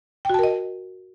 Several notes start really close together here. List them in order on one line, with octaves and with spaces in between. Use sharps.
G5 F#4 A5 A#4 D#5